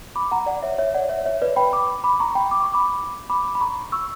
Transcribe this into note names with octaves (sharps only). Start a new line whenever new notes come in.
B5 D6
F#5 A#5
D5 F#5
C#5 E5
C#5 E5
D5 F#5
C#5 E5
C#5 E5
B4 D5
G5 B5
B5 D6
B5 D6
A#5 C#6
G5 B5
D6
C#6
B5 D6
B5 D6
B5
A#5 C#6
C#6 E6